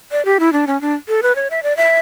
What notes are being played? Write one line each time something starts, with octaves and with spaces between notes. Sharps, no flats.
D5
G4
E4
D4
C#4
D4
A4
B4
C#5
E5
D5
E5